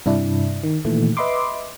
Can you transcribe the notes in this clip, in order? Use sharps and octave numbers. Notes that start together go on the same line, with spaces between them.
G2 C3 D4 E4
D#3
A#2 D#3 E3 A3
B4 D#5 E5 B5 C6 D6